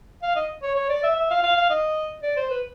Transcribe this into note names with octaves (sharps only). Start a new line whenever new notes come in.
F5
D#5
C#5
C#5
D5
E5
E5
F5
F5
F5
D#5
D5
C5
B4